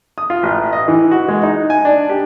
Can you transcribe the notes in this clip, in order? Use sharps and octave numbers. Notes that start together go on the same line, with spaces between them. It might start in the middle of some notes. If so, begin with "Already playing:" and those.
D#6
F4
A1
D#5
E3
F#4
G#3
D#4
G#5
D4
G4